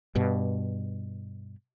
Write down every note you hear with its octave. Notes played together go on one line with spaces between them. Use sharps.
G2 B2